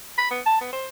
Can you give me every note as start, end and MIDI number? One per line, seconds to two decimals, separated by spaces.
0.18 0.29 83
0.31 0.41 59
0.46 0.57 81
0.61 0.72 59
0.73 0.87 72